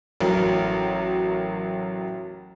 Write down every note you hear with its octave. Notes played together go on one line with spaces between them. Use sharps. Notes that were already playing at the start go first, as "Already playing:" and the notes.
A1 F#3 A#4